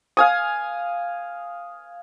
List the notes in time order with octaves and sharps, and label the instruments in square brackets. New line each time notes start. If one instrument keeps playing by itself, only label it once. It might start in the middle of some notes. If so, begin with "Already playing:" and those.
[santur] F5 G#5 D#6